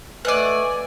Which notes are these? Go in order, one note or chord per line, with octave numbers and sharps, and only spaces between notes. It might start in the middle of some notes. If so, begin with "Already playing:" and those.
A3 B4 D5 D#5 F#5 G#5 D#7